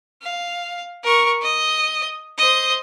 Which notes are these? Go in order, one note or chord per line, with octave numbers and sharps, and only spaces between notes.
F5
A#4 C#6
D#5
C5 D#5